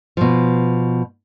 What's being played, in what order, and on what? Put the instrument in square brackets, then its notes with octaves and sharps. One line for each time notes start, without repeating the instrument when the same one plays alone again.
[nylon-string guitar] B2 F3